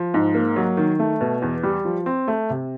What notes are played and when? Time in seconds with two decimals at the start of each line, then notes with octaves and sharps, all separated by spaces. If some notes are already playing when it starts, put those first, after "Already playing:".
Already playing: F3
0.14 G#2
0.35 A#3
0.56 F#3
0.77 D#3
0.99 A3
1.21 B2
1.42 E2
1.63 G3
1.85 F3
2.06 C4
2.28 A3
2.50 C3